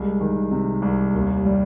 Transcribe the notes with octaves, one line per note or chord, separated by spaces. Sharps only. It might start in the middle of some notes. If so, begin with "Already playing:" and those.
Already playing: C2 G#3
D#3
C3
C2
D#2
G3